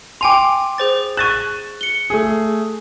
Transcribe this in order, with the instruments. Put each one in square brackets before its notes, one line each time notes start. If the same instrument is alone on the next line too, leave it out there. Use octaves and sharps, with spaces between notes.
[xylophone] G5 G#5 F7 [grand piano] C6 D6
[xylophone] G#4 C5 A6
[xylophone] C#6 E7 [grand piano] F#6 A6 D#7
[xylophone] C#7 G7
[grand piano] A3 G#4